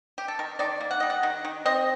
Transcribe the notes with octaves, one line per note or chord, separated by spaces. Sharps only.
G4
A4
D#3 A#4
D#3 D5
A#3
F#5
G3 D#5
F#5
D#3
D#3
C4 D#5